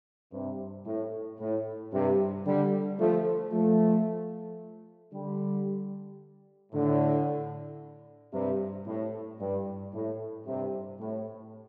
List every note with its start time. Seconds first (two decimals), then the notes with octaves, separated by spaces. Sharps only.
0.33 G2 C3
0.86 A2
1.40 A2
1.93 G2 C3
2.46 D3 G3
2.99 F3 A3
3.53 F3 A3
5.13 D3 G3
6.73 A2 D3
8.33 G2 C3
8.86 A2
9.40 G2
9.93 A2
10.47 G2 C3
11.00 A2